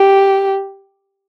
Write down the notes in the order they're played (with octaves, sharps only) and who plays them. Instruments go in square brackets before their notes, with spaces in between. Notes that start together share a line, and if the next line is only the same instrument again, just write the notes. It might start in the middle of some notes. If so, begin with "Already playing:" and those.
Already playing: [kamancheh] G4